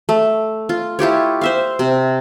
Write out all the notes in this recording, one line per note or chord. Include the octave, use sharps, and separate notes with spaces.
A3
F4
E4 F4 G4 C#5
C5 E5 F5
C3